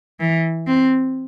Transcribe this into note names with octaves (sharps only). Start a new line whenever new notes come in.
E3
C4